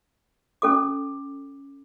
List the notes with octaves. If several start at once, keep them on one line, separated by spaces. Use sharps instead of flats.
C#4 A4 D6